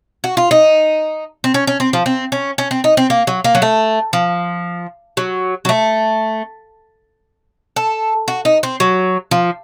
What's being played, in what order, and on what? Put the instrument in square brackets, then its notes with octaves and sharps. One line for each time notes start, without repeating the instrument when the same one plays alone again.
[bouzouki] F#4
F4
D#4
C4
C#4
C#4
C4
F3
C4
C#4
C#4
C4
D#4
C4
A#3
F#3
A#3
F#3
A3
F3
F#3
F#3
A3
A4
F#4
D#4
C4
F#3
F3